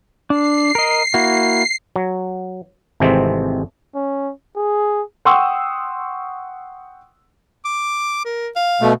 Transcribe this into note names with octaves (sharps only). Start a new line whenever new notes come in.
D4 C7
A#4 D#5
A#3 E4 F#4
F#3
G#1 C3 E3 G#3 A3 C4
C#4
G#4
F#5 G5 C6 C#6 D#6 E6
D6
A#4
F5
B2 A3